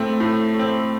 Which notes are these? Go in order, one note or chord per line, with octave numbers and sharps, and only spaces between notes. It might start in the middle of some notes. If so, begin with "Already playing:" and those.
Already playing: A2 A3 C4
A2
A3 C4